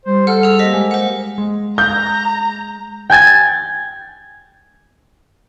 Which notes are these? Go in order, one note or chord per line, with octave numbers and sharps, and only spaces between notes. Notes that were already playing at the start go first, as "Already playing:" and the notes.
G3 C5
A4 F#5 F6
G#4 E6
A#3 C5 D#5 B6
G#3
C5 F#5
G#3
A#5 G6
G5 G#5 G#6 A6